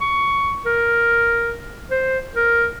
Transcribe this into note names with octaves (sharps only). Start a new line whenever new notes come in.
C#6
A#4
C5
A#4